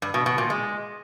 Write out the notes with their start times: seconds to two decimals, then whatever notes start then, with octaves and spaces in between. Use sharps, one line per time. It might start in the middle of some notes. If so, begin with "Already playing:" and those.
0.02 G2
0.14 B2
0.26 B2
0.38 A#2
0.50 G#3